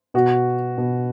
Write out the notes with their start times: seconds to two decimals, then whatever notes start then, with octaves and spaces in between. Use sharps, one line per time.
0.14 B2 F#4
0.78 B2